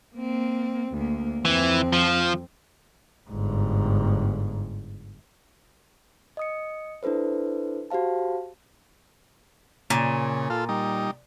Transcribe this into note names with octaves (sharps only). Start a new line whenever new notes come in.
A#3 C4
D2 A#3
F2 E3 C4
F3
G1 G#2
D#5 D#6 C#7
D4 E4 A4 B4 C5
F#4 G4 C5 F5 A5
A#2 C#3
F4 A4
G3 D#4